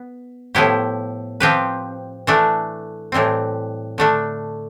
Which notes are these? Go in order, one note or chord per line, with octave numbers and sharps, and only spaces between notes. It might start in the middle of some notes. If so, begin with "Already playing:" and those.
Already playing: B3
A2 F3 B3 E4 G4
F3 C4 G4 B4
E3 A3 D4
A2 E3 G3 C4
D3 A3 D4